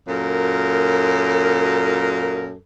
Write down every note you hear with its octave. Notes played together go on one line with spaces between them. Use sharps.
F#2 A#2 A4 A#4